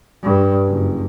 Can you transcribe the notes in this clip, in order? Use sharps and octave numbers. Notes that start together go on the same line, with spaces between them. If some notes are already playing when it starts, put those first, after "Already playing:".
G2
F#1